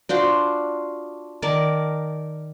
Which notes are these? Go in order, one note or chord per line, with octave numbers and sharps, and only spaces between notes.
D4 F4 F#4 C5
D#3 A#4 D5 A5